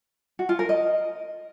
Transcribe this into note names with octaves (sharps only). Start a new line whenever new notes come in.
F#4
F4
A#4
D#5